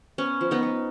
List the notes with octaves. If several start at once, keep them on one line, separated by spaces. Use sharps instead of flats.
B3 C#4
F3
B3 D#4
B3